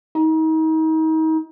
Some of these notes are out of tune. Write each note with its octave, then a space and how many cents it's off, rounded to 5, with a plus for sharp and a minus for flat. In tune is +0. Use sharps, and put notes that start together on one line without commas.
D#4 +35